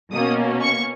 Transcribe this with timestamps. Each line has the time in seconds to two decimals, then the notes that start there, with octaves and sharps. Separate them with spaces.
0.11 B2 A#3 C#4 D#6
0.63 C#6